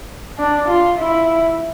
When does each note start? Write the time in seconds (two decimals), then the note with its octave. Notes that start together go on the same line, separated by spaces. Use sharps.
0.39 D4
0.69 F4
0.99 E4